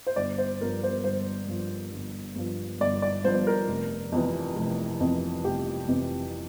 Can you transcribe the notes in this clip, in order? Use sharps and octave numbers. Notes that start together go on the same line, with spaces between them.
C5
G1 D5
C5
G2 F3 A#4
C5
G1 C5
G2 F3
G1
G2 F3
G1 D5
D5
G2 F3 C5
A#4
F1
F2 C3 E3
F1
F2 C3 E3
F1 G4
F2 C3 E3